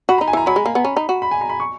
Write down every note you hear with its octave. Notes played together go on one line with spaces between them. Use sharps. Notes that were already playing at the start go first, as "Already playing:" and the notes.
F#4 B5
D#4 A#5
G#5
E3 A#5
F#3 B5
G#3
A#3
B3
C#4
D#4
F#4
B5
G#5
A#5
B5
C#6